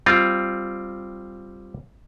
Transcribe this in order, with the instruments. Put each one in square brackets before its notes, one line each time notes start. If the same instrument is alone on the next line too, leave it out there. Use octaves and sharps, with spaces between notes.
[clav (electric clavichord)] G3 C4 F4